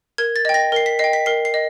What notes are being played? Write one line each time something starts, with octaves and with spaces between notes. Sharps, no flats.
A#4 G#6
A6
D#5 G5
A#6
A#4 C7
B6
D#5 G5 C7
B6
A#4 C7
C7
D#5